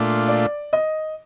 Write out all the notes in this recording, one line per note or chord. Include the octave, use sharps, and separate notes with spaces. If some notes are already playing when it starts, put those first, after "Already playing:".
Already playing: A#2 A3 D4 F4
D5
D#5